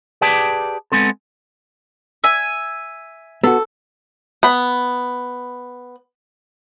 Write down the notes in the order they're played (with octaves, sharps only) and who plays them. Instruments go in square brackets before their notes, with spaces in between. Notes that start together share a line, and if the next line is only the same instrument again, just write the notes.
[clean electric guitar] G4 G#4 B4 D5 G5 A5
G#3 B3 C4 A4
[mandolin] E5 G#5
[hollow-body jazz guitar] B3 F#4 [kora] A4
[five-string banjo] B3 B5